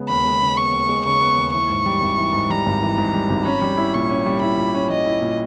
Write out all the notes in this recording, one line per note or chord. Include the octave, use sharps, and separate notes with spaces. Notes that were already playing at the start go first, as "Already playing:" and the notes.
Already playing: C#3 G#3 B3
D#2 B5
G#3
C#3
B3 C#6
D#2
G#3
C#3 C#6
B3
D#2
E3 C#6
G#2
G3
G#1
E3
G#2
G3 A#5
G#1
E3
G#2
G3
G#1
C#4 B5
G3
E4
A#2 C#6
C#4
G3
E4 B5
A#2
C#4
G3 D#5
E4
A#2